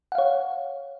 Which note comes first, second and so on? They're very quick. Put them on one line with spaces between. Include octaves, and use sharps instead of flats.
F#5 F5 C#5